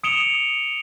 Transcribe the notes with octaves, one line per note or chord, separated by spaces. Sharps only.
D#6 C#7 D7 E7 F7 G7